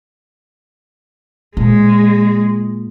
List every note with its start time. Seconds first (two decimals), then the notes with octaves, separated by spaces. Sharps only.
1.57 A#2 G#3